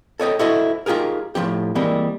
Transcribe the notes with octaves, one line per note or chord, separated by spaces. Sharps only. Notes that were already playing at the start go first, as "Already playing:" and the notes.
A4 C#5 D#5 G5
E4 F#4 A4 C5 D#5
D#4 F4 G4 G#4 A#4
A2 F3 B3 G4
E3 G3 G#3 A#3 C4